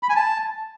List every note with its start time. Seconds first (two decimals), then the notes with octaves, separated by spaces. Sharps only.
0.03 B5
0.09 G#5
0.16 A5